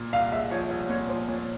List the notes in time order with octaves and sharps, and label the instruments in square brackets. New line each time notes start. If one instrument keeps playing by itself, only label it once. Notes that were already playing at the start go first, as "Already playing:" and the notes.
Already playing: [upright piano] A#2
[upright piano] C2 [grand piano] F5
[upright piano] G#3 [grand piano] E5
[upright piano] F3 [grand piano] C#5
[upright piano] C2 [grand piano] C#5
[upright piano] A#2 [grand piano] C#5
[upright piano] F3 [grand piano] C5
[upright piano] A#2 [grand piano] C#5